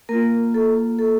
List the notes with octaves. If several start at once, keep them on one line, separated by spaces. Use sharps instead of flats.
A#3 F4 A#4
A4
A4